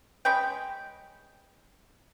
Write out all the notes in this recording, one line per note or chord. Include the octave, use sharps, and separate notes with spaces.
G#3 C#4 B4 G5